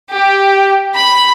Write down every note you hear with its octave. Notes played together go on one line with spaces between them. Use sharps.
G4
B5